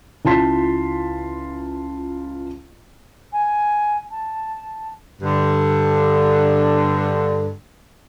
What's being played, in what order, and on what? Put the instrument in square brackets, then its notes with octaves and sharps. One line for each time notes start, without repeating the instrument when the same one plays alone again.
[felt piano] C#2 E4 F4 A5 C6 B6
[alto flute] G#5
A5
[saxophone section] G2 D3